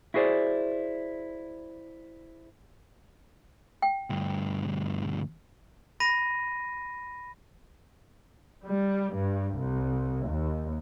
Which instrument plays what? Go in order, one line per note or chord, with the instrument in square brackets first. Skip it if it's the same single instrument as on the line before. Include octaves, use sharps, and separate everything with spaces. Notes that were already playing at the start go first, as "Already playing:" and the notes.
[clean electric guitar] E4 F#4 G#4 C5 D5
[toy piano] G5
[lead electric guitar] D2 G2
[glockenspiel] B5 A#6 D#7
[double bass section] G3
G2
C2
D#2